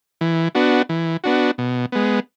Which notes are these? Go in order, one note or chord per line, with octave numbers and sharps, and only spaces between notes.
E3
B3 D4 F#4
E3
B3 D4 F#4
B2
G#3 B3